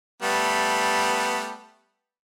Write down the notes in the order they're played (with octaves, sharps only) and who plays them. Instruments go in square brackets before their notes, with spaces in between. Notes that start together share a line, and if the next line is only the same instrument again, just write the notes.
[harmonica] G3 A3 B3